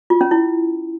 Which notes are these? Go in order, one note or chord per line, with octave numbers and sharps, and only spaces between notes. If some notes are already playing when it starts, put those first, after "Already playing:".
F4
C#4
E4